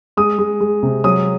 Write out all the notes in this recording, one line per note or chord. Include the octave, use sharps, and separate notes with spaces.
G#3 D#6
G#3
G#3
C3
F#3 D#6